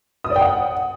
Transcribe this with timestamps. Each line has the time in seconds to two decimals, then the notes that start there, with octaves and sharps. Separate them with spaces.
0.24 D#6
0.30 D5
0.36 G5
0.41 F#5